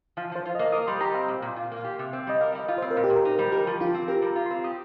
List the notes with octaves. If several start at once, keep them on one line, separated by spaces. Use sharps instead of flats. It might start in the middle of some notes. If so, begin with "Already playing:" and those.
F3 F5
F3 C5
F4
D#5
A#3
A#4 D#6
G3 C6
G4 A#5
C4 F5
A#2
A#2
F4
A#3
G4
C3
C4
G3 D#5
A#4 F5
G3 D#5
F4
C4 C5
A#4
A#2
G4
A#2
A#4
D#4
G3
G4 A#4
F3
F4 G4
C4
G4 A#4
G3 A#5
F4
C6
C4
G4 D#6